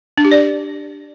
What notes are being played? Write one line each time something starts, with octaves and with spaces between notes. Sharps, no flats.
D4
G4
D5